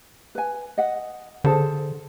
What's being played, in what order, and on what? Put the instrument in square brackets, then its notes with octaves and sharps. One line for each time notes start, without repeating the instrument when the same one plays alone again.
[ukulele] B4 G#5
D#5 F#5
[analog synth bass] D3 [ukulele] G#4 A4 C5